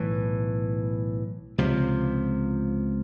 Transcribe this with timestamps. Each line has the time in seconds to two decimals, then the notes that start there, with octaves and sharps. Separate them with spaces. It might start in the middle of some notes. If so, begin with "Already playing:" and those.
Already playing: B1 A2 E3
1.58 C#2 C3 F3